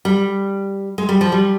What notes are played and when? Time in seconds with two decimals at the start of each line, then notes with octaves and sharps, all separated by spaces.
0.05 G3
0.98 G#3
1.09 G3
1.21 F3
1.32 G3